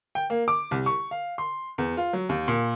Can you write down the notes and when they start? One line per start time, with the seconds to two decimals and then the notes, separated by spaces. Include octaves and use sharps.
0.15 G5
0.30 A#3
0.48 D6
0.71 C2
0.86 C#6
1.11 F5
1.38 C6
1.78 E2
1.97 F4
2.13 F#3
2.29 D#2
2.48 A#2